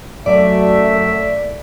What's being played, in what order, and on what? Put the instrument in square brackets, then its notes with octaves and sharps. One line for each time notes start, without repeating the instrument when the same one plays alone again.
[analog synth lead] F#2 [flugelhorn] A3 [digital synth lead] D5 [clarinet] E5